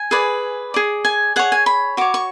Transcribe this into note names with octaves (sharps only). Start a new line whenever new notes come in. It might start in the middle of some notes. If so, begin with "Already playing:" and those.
Already playing: G#5
G#4 B4 D5
G#4 D5
G#5
G#4 C#5 F#5
G#5
B5
F#4 C#5 D6
C#6